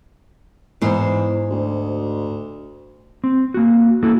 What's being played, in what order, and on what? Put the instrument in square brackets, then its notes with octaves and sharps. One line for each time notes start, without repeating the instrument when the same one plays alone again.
[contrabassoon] E2 [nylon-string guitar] G#2 C5
[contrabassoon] D2
[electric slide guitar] C4
A#3 F#4
A#3 E4 F#4 A4